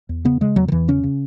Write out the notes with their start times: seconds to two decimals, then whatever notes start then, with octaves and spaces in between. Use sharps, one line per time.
0.09 E2
0.25 C#3 B3
0.41 C#3 G#3
0.56 E2 F#3
0.68 D#3
0.72 E2 E3
0.88 C#3 C#4
1.03 C#3